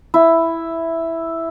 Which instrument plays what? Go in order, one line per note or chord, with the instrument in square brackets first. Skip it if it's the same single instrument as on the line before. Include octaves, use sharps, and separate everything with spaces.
[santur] E4